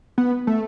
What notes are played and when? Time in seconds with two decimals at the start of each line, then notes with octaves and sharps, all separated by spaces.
0.18 B3
0.47 A3